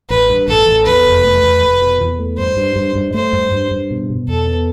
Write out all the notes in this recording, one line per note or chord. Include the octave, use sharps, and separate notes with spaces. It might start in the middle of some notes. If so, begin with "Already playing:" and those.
A1 B4
G2
A1 A4
A1
E2 B4
F1
A3
E2
F1
B2
E2
A3
G2 C5
G2
G2
G2
A3 C5
G2
G2
G2
B2
B2
E2 A4
B3